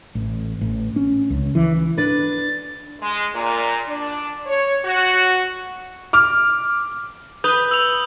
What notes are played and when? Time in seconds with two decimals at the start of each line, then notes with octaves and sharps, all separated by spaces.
0.15 A1
0.61 A1
0.96 C#4
1.30 C#2
1.55 E3
1.97 D4 B4 A6
3.01 G#3
3.35 A#2
3.88 D4
4.46 C#5
4.85 F#4
6.13 D6 F6
7.44 B4 D#6 G6 G7
7.71 E6 F7